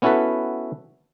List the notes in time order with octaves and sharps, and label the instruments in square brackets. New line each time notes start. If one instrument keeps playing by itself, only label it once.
[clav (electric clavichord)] B3 C#4 E4 F#4 A4 B4